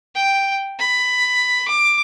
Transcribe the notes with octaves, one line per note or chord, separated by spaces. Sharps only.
G5
B5
D6